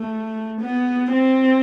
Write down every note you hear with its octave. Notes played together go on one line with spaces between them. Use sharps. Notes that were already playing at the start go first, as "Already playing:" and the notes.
Already playing: A3
B3
C4